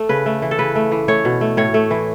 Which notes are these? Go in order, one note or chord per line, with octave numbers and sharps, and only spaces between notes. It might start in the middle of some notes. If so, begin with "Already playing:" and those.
Already playing: A3 A4
C#3 B4
A3
E3
A4
C#3 B4
A3
E3
A3 C#5
B2
A3
A2 C#5
A3
E3